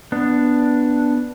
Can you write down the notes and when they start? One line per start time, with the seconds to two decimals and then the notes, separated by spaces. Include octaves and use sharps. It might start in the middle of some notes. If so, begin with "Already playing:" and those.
0.12 B3 D4